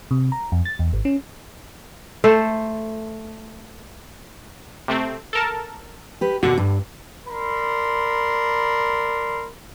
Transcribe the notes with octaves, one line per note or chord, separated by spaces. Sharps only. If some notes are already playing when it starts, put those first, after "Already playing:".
C3
A#5
F2
A6
E2
G#1
C#4
A3 A4 C5
C3 A3 C4
A4 A#4 A5
G4 B4
D#2 B2 D3 F#4
G2
A#4 D5 B5 C6